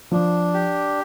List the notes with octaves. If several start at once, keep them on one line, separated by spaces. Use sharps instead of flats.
F3 D4
G4